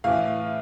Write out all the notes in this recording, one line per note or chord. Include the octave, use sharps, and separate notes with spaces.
A2 E3 F5